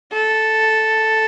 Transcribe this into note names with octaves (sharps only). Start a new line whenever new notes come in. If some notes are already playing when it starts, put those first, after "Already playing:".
A4